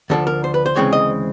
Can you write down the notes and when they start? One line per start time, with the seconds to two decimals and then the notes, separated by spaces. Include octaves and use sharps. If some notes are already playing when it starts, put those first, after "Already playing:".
0.10 D2 D3 F3 A4
0.27 A#4
0.44 C5
0.54 B4
0.66 C5
0.76 D2 C#3 E3 G#3 C4 C#5
0.93 D#5